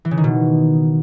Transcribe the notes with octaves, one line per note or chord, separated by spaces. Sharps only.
E3
C#3
D#3
B2